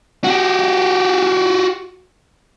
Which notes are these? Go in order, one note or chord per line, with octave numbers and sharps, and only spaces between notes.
F#4 G4